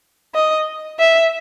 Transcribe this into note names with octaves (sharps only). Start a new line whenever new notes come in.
D#5
E5